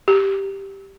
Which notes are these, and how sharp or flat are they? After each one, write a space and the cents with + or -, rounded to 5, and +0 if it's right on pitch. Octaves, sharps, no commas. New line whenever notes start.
G4 -5